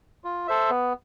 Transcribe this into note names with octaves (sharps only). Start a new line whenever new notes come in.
F4
A4 C5 E5
B3